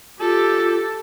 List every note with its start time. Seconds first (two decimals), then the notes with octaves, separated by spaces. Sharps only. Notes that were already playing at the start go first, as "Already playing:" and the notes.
0.21 F4 G4 A4